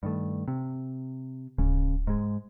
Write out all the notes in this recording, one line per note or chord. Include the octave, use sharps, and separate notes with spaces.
G2 D#3 A3
C3
D1 C#3
G#2 G#3